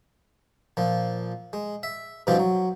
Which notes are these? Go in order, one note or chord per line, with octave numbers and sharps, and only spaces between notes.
A#2 F3
G#3
E5
G2 B2 E3 F3 C4 F4
F#3